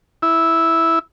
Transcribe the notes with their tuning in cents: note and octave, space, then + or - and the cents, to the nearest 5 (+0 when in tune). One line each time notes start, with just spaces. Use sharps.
E4 -5